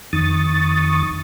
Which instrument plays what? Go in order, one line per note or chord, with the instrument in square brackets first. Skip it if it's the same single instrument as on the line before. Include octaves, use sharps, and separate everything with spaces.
[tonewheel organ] F2 D#3 C#6 D#6 A6